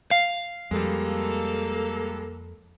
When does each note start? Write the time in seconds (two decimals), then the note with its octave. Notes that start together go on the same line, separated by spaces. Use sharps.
0.11 F5
0.71 F2 G3 G#3 A#3 A4